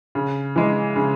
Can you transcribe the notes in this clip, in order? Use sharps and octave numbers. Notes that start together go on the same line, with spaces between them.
C#3
E3 G#3
C#3